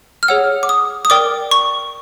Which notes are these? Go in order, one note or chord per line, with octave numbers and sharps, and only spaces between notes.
F6
G#4 C#5 F#5 E6
D6
D#6
D#6
A#4 D5 G5 D6
C#6